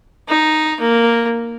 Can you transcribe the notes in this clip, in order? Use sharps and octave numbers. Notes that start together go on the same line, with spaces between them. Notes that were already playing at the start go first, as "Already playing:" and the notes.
D#4
A#3